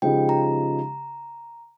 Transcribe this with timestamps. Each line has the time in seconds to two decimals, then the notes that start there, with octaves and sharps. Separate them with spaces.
0.02 C#3 F3 G#3 D#4 G4 G5
0.29 A#5